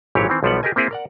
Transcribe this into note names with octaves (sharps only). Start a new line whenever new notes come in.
G#1 A#2 E3 F#3 G4 C#5
D#3 E3 C4
B1 F3 G3 B3 F#5
G4 G#4 A#4 D#5 G#5
A#3 C4 E4 G#4
A#4 D5 F#5